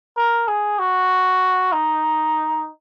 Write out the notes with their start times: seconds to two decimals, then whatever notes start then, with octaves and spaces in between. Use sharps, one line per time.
0.17 A#4
0.48 G#4
0.79 F#4
1.72 D#4